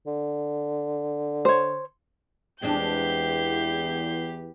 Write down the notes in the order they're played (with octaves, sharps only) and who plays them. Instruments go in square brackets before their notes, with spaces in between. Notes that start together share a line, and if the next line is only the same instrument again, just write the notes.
[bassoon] D3
[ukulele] C5 C#5
[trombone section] E2 [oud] G#3 C4 D4 [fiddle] G4 B4 [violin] G6 C7